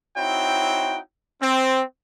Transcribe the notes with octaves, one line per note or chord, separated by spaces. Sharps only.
C4 D#4 E4 F#4 C#5 G5
C4